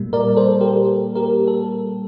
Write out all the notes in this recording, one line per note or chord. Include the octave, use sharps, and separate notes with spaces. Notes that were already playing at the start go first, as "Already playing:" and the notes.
Already playing: A#2 G3 A#3
A#4 D5
A4 C5
G4 A#4
G4 A#4
A4